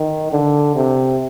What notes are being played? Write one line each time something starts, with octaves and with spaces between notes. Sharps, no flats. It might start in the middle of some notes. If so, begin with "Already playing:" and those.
Already playing: D#3
D3
C3